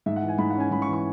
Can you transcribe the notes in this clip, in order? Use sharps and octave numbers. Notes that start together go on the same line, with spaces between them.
G#2 E5
F#5
E3
G#5
G#2 B5
C#4 F#5
G#5
G#2 B5
C#6
E3
C#6